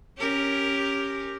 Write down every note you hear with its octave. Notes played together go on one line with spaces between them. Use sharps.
C#4 G4 A#4